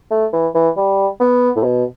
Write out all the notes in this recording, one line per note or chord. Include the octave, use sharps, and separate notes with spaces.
A3
E3
E3
G3
B3
A2
B2